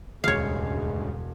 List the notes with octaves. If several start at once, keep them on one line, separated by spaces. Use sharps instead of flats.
E1 D2 G2 C#3 G#3 C#5 F5